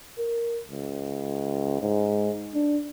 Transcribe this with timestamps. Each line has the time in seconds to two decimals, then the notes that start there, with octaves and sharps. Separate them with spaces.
0.18 A#4
0.67 C#2
1.81 G#2
2.54 D4